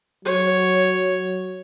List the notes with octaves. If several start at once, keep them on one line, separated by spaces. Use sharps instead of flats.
F#3 C#5